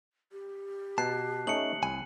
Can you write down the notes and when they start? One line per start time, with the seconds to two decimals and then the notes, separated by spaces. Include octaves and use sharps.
0.32 G4
0.98 B2 A5 F#6 C7
1.47 A3 C#4 D#4 C#7 F#7
1.83 C2 G#5